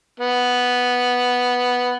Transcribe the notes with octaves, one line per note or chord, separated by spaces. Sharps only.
B3